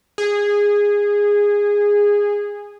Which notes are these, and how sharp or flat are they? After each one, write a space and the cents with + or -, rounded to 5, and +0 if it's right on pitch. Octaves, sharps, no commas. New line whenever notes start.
G#4 -15